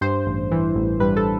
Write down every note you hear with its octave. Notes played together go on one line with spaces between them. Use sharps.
G2 C5
A1
E3
A1
G2 B4
A4